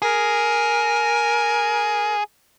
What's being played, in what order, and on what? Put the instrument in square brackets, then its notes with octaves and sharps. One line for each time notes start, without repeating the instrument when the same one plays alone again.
[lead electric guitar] G#4 [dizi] A#4